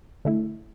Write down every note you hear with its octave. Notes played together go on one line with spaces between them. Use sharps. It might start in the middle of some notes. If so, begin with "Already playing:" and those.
D3 A3 E4